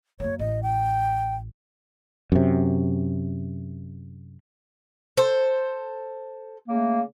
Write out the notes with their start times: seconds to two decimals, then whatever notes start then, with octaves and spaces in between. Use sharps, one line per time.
0.20 F#2 A#3 C#5
0.39 A1 D#5
0.63 G5
2.32 F#2 C3
5.17 A4 C5
6.69 C#3 A3 A#3